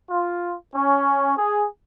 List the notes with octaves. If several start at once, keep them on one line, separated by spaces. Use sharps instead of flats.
F4
C#4
G#4